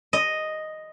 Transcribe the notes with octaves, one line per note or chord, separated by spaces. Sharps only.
D#5